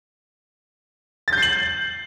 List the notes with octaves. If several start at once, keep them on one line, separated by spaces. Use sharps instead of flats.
G6 A6 C7 F#7